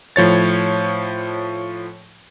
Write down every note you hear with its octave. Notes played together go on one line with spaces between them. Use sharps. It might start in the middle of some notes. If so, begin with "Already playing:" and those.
A2 F3 C#5 A6